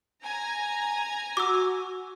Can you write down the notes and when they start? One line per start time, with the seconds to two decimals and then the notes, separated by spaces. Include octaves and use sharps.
0.22 G#5 A#5
1.37 F#4 D6 E6